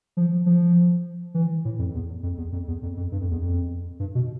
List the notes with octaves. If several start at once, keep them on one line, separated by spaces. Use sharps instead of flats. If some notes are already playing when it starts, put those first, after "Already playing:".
F3
F3
E3
A2
F2
E2
F2
E2
F2
E2
F2
F2
G2
F2
E2
F2
G2
B2